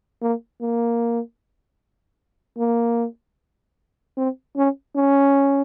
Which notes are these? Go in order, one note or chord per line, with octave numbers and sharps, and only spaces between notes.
A#3
A#3
A#3
C4
C#4
C#4